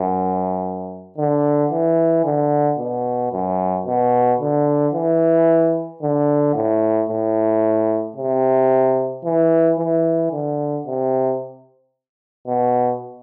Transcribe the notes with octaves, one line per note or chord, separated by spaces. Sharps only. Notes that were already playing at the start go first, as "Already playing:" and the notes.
Already playing: F#2
D3
E3
D3
B2
F#2
B2
D3
E3
D3
A2
A2
C3
E3
E3
D3
C3
B2